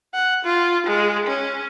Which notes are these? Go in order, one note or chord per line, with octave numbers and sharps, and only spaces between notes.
F#5
F4
G#3
C#4